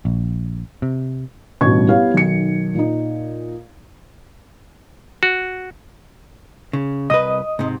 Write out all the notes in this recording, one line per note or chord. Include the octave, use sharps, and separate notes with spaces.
A#1
C3
D#1 A1 G2 B2 C#6 G#6
B3 E4 G4 C#5 F5
B1 D#3 C#7
A#2 D#4
F#4
C#3
C2 B4 D#5 D#6
G#2 C3